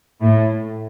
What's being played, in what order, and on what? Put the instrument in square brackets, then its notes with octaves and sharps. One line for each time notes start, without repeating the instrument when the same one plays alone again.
[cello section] A2